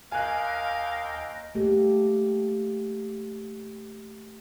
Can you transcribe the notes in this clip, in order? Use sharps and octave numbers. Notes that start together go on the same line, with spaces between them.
D#2 A#4 D#5 F5 G5 G#5 F#6
A3 A#3 G4 A4